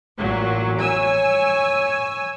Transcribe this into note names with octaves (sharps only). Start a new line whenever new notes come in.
A1 A#2 F#3
C#5 G#5 E6